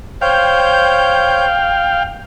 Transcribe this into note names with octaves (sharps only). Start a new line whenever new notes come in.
C5 C#5 F5 G5 G6